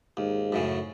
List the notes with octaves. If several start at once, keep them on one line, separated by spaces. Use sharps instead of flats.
D#2 G#2
F#2 A2 C#3